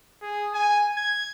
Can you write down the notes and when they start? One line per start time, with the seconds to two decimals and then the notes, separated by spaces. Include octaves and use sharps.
0.22 G#4
0.54 G#5
0.97 G#6